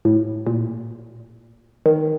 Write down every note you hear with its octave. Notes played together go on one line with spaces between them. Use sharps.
A2
A#2
D#3